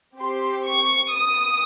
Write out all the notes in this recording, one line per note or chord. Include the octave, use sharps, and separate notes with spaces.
C4 G4 C6
C#6
D#6